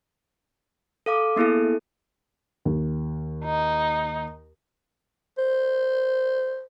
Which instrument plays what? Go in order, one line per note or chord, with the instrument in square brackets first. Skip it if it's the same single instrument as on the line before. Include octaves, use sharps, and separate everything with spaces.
[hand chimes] A4 F5 D6
A#3 B3 E4 G#4 A4
[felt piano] D#2
[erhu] D#4
[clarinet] C5